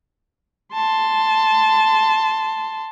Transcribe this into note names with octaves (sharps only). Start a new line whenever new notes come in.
A5 C6